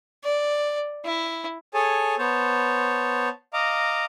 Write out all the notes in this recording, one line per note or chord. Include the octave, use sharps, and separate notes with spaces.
D5
E4
G#4 A4 C#5 G#5 A5
B3 C5 C#5 A5
D#5 F5 A#5 D6